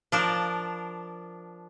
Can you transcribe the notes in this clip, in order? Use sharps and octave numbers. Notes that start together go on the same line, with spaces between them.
F3 D4 A#4